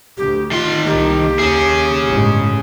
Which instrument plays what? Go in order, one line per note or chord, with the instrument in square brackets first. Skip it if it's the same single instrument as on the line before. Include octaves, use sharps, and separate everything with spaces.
[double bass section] D2 [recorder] G4
[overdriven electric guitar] D#3 C6 [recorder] F4
[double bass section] C2 A#3 [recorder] G4
[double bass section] D#2 [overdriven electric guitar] C#4 G#4
[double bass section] G1 A2 G#3